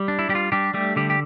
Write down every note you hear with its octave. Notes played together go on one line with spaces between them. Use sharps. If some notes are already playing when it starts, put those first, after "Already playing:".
Already playing: G3
D4
E4
G3 G4
F4
G3 D4 G4
G3 A3 G4
D3 G3 G4
G4